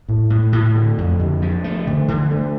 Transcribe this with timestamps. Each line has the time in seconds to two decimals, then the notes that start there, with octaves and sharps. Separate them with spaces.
0.09 A2
0.30 A2
0.53 A2
0.76 D3
0.98 F2
1.19 D3
1.42 F3
1.64 A3
1.87 D3
2.08 D3
2.31 A3